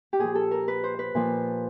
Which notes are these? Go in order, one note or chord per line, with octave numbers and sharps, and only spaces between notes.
G4
A#2 F3 G#4
A4
A#4
B4
C5
B4
A#2 F3